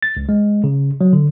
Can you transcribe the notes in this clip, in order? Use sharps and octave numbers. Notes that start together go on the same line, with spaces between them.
A6
C#2
G#3
C#3
F#3
D3